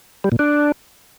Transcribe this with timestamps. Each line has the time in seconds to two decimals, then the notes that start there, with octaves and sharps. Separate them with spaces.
0.24 G3
0.32 A#2
0.39 D4